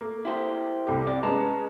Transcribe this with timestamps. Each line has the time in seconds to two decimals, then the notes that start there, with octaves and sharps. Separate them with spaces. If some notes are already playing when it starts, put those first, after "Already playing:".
0.01 A3 A#3
0.25 E4 G4 C5
0.87 C2 A3 G4
1.07 C3 G4 D5
1.23 G#3 B3 C#4 B4 A5 A#5